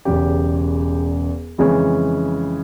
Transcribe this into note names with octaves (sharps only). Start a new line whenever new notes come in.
E1 E2 C#3 G4
F2 C#3 E3 G#3 C#4